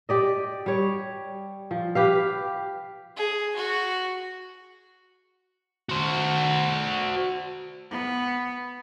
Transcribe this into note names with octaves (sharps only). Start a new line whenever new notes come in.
G4 D5 D#5
G3 C#5
F3
G4 B4 F5
G#4
F#4
F#4 C5
B3